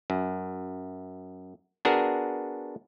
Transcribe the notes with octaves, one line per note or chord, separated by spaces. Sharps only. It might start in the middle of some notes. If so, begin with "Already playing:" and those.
F#2
B3 D4 F#4 G#4 A#4